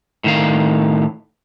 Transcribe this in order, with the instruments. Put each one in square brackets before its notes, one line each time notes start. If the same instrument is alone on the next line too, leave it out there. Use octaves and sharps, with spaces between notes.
[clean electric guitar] A2 D#3 F5